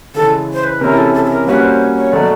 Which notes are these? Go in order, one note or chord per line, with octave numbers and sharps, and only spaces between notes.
C#3 E3 G#3 A4
C5
B4
C3 E3 G#3 C#4 E4 A#4
A4
A4
A4
A#4
G3 A#3 C#4 F#4 B4
C5
C#5
C#5
B2 F#3 A3 D5